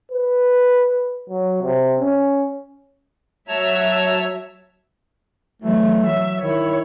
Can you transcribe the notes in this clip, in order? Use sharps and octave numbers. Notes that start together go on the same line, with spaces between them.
B4
F#3
C3
C#4
F#3 C#5 E5 A5 A#5
E3 F#3 A3
F#3 E5
D#3 E4 C#5